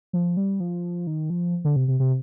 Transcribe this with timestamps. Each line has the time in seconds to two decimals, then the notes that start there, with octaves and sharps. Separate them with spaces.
0.13 F3
0.37 G3
0.60 F3
1.07 D#3
1.30 F3
1.65 D3
1.76 C3
1.88 C3
2.00 C3